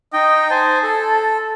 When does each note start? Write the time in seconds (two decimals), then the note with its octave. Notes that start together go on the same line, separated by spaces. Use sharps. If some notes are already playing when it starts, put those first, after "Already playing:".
0.13 D#4 D#5 G5
0.51 C5 G#5 A5
0.83 A4